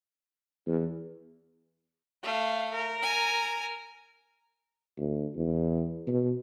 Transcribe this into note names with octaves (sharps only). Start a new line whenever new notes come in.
E2
A3 F5
A#4
G#5 A#5
D2
E2
B2